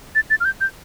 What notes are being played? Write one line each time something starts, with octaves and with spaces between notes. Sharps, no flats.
A6
A6
F6
G6
G6